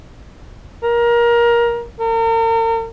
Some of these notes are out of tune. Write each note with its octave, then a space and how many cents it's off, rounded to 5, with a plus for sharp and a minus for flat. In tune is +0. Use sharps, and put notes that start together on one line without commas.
A#4 +20
A#4 -40